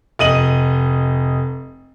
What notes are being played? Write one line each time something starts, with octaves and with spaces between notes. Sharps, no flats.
F1 D#5 D#7 F#7